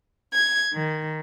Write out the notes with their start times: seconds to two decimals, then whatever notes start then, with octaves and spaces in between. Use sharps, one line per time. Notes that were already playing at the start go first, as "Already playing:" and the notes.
0.33 G#6
0.72 D#3